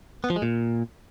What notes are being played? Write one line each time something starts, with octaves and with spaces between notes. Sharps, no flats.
B3
F3
G#3
A#2